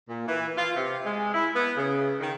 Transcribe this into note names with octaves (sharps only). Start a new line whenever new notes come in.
A#2
E3
F4
C3
G#3
E4
B3
C#3
D#3